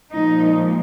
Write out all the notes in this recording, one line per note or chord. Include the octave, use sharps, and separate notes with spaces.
A#2 F3 G#3 D#4